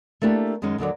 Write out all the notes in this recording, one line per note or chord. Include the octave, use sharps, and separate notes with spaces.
A3 A#3 D4 E4 G4
F#2 D#3 G#3 C#4 D#4
D#2 D3 F#3 D5